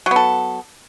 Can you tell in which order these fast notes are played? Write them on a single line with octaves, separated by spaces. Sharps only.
F#3 B3 A4